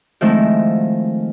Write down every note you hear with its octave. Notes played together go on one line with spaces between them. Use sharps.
D#3 F3 G#3 A3 C4 E4